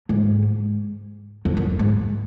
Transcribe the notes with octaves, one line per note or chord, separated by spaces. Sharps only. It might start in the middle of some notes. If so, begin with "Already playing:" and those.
G#2
F2
F#2
G#2